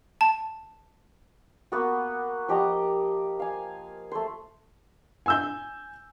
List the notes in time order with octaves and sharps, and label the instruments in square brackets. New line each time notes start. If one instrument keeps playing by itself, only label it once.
[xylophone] A5
[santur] A#3 B3 F#4
F3 G4 D#5 A#5
F5 G#5
A3 C5
[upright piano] G#5 E6 G6